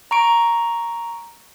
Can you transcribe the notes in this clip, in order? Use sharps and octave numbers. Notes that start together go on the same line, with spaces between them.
A#5 C#6 D7